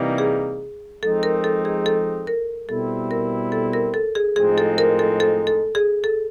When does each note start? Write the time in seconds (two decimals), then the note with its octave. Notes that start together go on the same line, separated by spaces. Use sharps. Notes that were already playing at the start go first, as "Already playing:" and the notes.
Already playing: C3 E3 G3 A#3 D#4
0.18 G#4
1.02 F3 G#3 C4 D#4 A4
1.23 A#4
1.44 A4
1.65 G#4
1.86 A4
2.27 A#4
2.69 B2 G3 C4 E4 A4
3.11 A#4
3.52 A4
3.73 A#4
3.94 A4
4.15 G#4
4.36 A2 F3 G#3 C4 D#4 G#4
4.58 A4
4.78 A#4
4.99 A4
5.20 A4
5.47 A4
5.75 G#4
6.04 A4